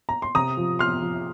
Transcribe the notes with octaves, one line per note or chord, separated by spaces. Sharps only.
A#5
C6
C3 A#5 D#6
F3
F3 C6 F6
F3